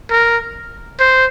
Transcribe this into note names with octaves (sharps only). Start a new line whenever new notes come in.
A#4
C5